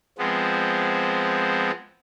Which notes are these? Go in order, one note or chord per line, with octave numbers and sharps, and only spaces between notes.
F3 G#3 B3 C4